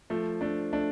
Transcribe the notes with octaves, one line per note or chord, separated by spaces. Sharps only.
F3 A3
A3 D4
A3 D4